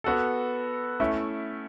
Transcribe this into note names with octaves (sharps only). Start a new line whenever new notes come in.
B3 F#4 A4
A3 C#4 E4